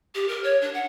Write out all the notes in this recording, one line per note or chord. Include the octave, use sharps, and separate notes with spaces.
G4
A#4
C#5
D4
F#5